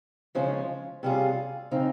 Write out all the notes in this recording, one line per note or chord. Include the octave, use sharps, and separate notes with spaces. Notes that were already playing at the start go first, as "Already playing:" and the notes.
C#3 F3 G#3 C#4
C3 G3 C#4 F4 G#4
C#3 F3 C4 D#4